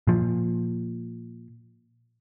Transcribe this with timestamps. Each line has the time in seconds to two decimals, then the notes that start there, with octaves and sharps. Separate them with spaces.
0.07 A#2 F3